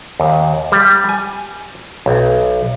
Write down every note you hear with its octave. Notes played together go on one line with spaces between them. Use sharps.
D#2
G3
G#5
B1